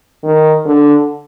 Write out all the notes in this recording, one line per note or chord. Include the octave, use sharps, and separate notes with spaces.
D#3
D3